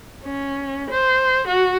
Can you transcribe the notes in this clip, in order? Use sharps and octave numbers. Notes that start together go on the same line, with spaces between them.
C#4
C5
F#4